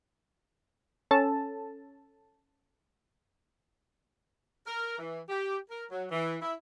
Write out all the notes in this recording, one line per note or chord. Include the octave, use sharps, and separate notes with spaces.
C#4 A4 A5
A#4
E3
G4
A#4
F#3
E3
E4